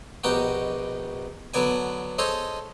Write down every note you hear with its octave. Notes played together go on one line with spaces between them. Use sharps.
A#1 B2 D#4 F#4 G4
D3 F#3 B3 D5 G#5
G#4 A4 C5 C#5 D#5